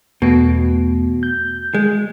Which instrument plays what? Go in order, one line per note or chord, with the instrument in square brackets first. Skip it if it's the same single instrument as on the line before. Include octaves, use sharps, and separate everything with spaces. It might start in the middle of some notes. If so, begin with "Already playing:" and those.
[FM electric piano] E2 A3 B3 [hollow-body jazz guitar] B2
[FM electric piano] G6
[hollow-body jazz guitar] G#3